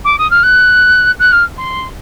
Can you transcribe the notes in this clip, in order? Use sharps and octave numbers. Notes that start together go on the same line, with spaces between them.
D6
D#6
F6
F#6
F#6
F6
C6